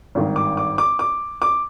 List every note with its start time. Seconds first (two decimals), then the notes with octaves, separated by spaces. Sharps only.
0.15 G#1 G2 D#3
0.36 D6
0.57 D6
0.78 D6
0.99 D6
1.42 D6